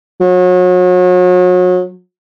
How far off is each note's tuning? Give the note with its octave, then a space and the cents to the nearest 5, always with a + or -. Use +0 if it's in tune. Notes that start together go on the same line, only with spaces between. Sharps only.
F#3 -35